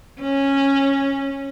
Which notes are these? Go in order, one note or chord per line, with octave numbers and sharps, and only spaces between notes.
C#4